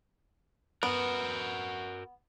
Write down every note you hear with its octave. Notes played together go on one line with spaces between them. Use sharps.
B3 F#4 A#4